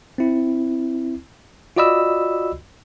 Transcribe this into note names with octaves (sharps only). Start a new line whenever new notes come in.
C4 E4
F4 F#4 D5 D#5 B5 E6